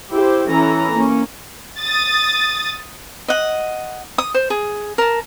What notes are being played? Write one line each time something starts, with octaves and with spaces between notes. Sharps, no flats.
E4 G4 C5
E3 C#4 E4 A4 A#5
A#3 C#4
D#6 A6
D#5 F#5
D#6
C5
G#4
A#4 A5